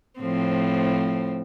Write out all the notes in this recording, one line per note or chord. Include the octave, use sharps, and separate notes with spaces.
A2 F3 C4